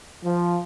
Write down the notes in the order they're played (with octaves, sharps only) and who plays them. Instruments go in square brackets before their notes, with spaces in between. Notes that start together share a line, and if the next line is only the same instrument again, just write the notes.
[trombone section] F3